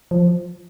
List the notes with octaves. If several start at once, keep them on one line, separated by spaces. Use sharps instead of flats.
F3